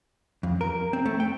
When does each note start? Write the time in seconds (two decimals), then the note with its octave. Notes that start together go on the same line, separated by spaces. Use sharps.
0.43 F2
0.61 A#4
0.93 C4
1.06 A3
1.20 G5